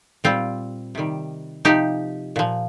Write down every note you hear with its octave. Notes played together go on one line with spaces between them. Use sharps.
A#2 G3 C4 F4
C3 D#3 G3
C3 F3 D#4 G4
A#2 F3